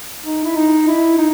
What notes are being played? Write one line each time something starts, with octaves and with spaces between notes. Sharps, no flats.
D#4
E4
D#4
E4
D#4